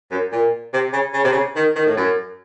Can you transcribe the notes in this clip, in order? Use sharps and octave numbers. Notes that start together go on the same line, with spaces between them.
F#2
A#2
C3
C#3
C#3
C3
C#3
D#3
D#3
A2
F#2